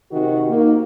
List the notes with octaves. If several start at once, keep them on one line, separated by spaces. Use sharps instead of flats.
C3 D#3 F#4
A#3 D#4